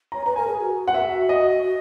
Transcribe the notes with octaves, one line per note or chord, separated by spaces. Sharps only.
C#5 A#5
B4 A#5
A#4 G#5
G#4
F#4
F#5
E5
D#5